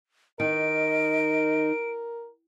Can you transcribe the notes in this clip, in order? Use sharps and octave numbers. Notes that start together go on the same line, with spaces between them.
D#3 A#4 D#5 D7